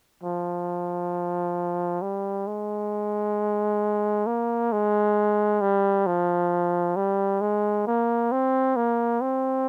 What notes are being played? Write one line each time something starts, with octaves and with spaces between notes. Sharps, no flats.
F3
G3
G#3
A#3
G#3
G3
F3
G3
G#3
A#3
C4
A#3
C4